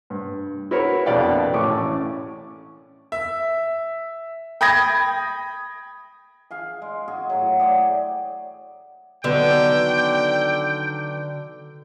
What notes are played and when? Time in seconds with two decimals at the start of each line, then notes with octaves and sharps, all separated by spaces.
0.10 G2
0.71 E4 F#4 A#4 B4 C#5
1.06 A#1 F2 B2 D5 F5 G5
1.54 A1 A2 C#4 C#6 D6
3.12 E5
4.61 G5 B5 D#6 G#6 A#6
6.51 G#4 F5 G#5
6.82 G#3
7.08 F#4 G#4 G#5
7.30 A2 F#3
7.59 G#4 D5 F#5 G5
9.24 D3 D#3 F#3 B3 G5